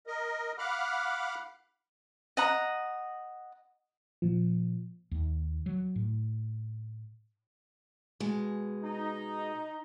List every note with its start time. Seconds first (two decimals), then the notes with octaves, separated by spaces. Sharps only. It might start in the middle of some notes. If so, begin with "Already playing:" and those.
0.07 A#4 D#5
0.58 F5 F#5 B5 D6 F6 F#6
2.37 D#5 F#5 A#5
4.22 A#2 F3
5.11 D#2
5.66 F#3
5.96 A2
8.20 B2 G#3
8.83 D#4